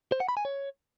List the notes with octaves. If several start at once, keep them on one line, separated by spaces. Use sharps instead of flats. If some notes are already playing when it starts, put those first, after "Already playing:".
C5
F#5
B5
G#5
C#5